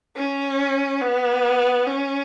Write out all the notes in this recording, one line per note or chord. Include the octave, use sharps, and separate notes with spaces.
C#4
B3
C#4